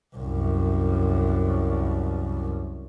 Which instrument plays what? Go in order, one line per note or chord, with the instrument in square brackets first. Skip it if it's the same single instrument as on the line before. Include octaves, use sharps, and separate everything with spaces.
[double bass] C2 F#2